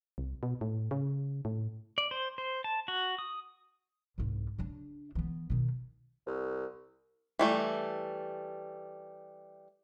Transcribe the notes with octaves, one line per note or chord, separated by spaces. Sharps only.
C2
B2
A2
C#3
A2
D5
C5
C5
A5
F#4
D#6
C2 G#2
C#3 D4
E3 B3
B2 D#3
C2
E3 G3 A3